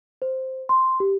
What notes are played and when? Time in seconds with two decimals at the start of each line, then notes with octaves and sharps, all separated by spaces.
0.22 C5
0.69 C6
1.00 G4